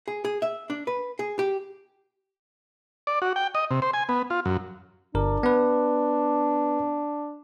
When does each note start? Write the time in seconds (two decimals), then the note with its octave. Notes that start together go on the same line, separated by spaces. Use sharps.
0.08 G#4
0.25 G#4
0.42 E5
0.70 D4
0.87 B4
1.19 G#4
1.39 G4
3.07 D5
3.22 F#4
3.36 G5
3.55 D#5
3.71 C3
3.82 C5
3.94 G#5
4.09 B3
4.30 F4
4.45 F#2
5.15 G1 D4 A#4
5.43 B3 B4